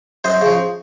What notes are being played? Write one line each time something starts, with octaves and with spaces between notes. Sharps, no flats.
F#2 C5 D#5
C#3 F3